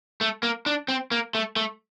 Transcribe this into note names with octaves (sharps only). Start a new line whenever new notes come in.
A3
A#3
D4
C4
A#3
A3
A3